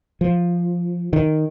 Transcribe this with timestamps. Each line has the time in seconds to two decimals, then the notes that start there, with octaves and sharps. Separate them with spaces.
0.21 F3
1.13 D#3